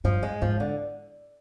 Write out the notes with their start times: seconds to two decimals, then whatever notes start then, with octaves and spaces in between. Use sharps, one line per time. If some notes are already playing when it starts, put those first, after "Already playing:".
0.04 G2 F3
0.23 G#3
0.42 G#2 F3
0.60 D3